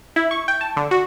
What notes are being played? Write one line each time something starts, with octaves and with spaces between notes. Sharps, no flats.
E4
C#6
G5
A5
D3
F#4